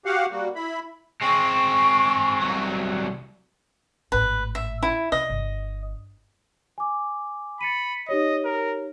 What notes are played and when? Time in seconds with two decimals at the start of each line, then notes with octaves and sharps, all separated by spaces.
0.05 F#4 G4 F5 F#5
0.31 G3 A#3 F#4
0.55 E4 B5
1.22 G#3 C4 C#6
2.42 C2 F#3
4.12 G#1 A2 B4
4.55 E5
4.83 E4
5.12 C3 D#5
5.30 G1
6.78 G#5 D6
7.61 B5 A6 C#7 D#7
8.09 D#4 G4 C#5 D#5
8.45 A#4